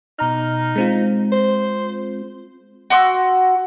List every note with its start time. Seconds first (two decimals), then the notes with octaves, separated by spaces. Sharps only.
0.19 B2 D#4 A#5 F6
0.76 G#3 C4 F4
1.32 C5
2.90 F#4 C6 D6 E6